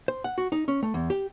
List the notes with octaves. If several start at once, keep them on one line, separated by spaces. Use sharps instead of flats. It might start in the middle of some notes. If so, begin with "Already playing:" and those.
C5
F#5
F#4
D#4
C#4
A3
E2
G4